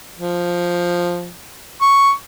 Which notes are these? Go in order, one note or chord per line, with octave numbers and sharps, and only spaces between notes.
F3
C#6